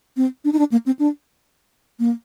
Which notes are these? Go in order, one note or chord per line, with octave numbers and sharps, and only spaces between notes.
C4
D4
D#4
D4
A#3
C4
D4
A#3